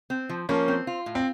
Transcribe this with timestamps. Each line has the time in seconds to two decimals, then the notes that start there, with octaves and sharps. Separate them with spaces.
0.10 C4
0.29 F3
0.49 F3 A#3 C#4
0.68 C4
0.87 F4
1.06 A2
1.15 C4